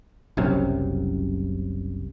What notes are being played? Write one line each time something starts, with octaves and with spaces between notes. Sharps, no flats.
F#1 C2 F#2 C3